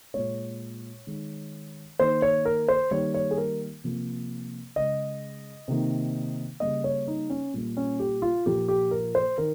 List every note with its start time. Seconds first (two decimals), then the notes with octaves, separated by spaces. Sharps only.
0.14 A#2 G#3 C#5
1.07 D#3 G#3
1.99 D#3 A#3 C5
2.22 C#5
2.45 A#4
2.68 C5
2.91 D#3 G3 A#3 C#5
3.14 C#5
3.31 G#4
3.38 A#4
3.84 C3 F3 A#3
4.76 C#3 G#3 D#5
5.68 C3 D#3 A#3
6.60 C#3 G3 A#3 D#5
6.84 C#5
7.08 D#4
7.30 C#4
7.54 A#2 G3 A#3
7.77 C#4
8.00 G4
8.22 F4
8.46 A#2 F3 A#3 G4
8.68 G4
8.91 A#4
9.15 C5
9.38 D#3 A#4